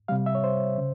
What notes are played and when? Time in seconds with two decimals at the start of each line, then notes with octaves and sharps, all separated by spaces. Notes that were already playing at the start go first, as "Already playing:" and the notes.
0.08 C3 G3 F5
0.26 E5
0.35 C#5
0.44 C5
0.78 C#3